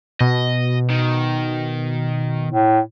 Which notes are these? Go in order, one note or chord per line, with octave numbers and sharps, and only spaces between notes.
B2 D#5
D#3
A2